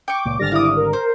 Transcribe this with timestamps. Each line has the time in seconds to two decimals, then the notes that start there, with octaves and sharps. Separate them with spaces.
0.08 G5 C#6 D6
0.25 C#2 A#2
0.39 G#1 D3 G3 F6 A6 A#6
0.52 E4 F5 D6 D#6
0.77 A#4
0.93 C5